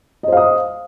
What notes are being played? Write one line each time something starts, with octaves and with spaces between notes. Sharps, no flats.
C5 D#5 F5 D#6